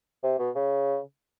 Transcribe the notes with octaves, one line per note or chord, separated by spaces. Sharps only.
C3
B2
C#3